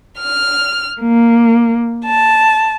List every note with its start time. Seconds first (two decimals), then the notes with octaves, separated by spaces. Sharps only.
0.19 F6
1.01 A#3
2.05 A5